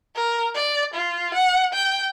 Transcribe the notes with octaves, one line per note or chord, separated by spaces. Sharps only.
A#4
D5
F4
F#5
G5